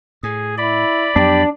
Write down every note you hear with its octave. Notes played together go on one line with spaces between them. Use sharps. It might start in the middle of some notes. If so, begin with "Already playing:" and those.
A2 G#4
E4 D5 B5
F2 F#3 B3 D4 G4